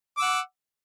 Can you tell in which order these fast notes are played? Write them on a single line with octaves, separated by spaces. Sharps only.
D6 E6 F#5